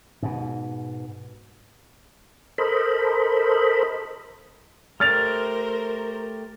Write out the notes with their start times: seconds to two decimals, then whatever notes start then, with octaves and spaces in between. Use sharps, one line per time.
0.22 G#2 B2
2.58 A4 A#4 C5 D#5 B5
5.00 A3 G4 A#4 C5 A#5 F6 A6 F7